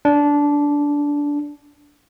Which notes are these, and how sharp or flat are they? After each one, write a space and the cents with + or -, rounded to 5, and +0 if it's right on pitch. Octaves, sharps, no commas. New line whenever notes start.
D4 -15